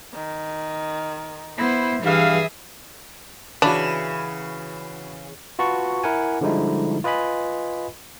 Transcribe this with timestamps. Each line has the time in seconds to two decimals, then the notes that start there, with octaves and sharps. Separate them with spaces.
0.14 D#3
1.58 B3 E4 C5
2.03 G2 E3 G#4 E5 F5
3.62 C#3 E3 D4 F#4 B5 E7
5.59 F4 F#4 B4 A5 C#6
6.03 E4 A#4 F#5 G#5
6.41 D3 F3 G3 G#3 D#4 E4
7.04 F4 B4 D#5 G#5 B5